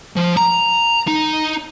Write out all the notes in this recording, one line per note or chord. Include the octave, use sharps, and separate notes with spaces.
F3
A#5
D#4